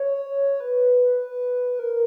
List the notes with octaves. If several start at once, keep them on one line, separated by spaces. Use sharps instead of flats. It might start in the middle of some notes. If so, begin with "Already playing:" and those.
Already playing: C#5
B4
A#4